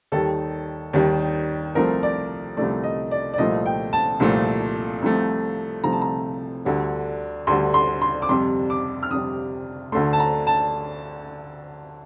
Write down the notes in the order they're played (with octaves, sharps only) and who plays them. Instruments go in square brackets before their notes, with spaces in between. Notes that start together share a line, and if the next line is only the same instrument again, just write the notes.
[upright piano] D#2 D#3 G3 A4
D#2 D#3 G3
C2 C3 F3 A3 A#4
D5
C2 C3 F3 A3 D5
D#5
D5
D5
C2 A#2 F3 A3 D#5
G5
A5
C2 A#2 F3 A3
C2 C3 F3 A3
C2 C3 F3 A3 A#5
A5
A#5
D2 D3 G3
D2 D3 G3 C6
C6
C6
D6
F2 C3 G3 C6
D6
F6
F2 C3 G3 D#6
D2 D3 A3 C6
A5
A#5
A5